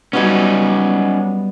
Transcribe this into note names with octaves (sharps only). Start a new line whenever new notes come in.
F#3 G3 B3 C#4 D#4